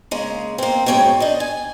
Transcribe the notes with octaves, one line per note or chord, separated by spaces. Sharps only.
C#3 G#3 A#3
A#3 C4
G#2 B2 C#4 C#5 G5
D4 D#5
G#5